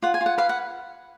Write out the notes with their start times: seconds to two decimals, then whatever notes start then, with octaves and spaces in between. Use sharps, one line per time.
0.02 F4 F#5
0.14 G#5
0.21 F4
0.26 F#5
0.38 B4 F5
0.49 F#5